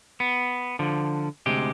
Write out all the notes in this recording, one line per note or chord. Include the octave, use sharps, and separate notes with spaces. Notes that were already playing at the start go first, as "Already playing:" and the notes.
B3
D3 F3
D2 C3 G#3 G4